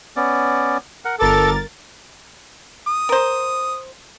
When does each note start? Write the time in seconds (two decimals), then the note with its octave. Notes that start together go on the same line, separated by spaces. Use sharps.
0.16 B3 C#4 D5
1.05 A#4 F#5
1.19 G1 A4 A#4 D6 A6
2.87 D#6
3.09 A#4 C5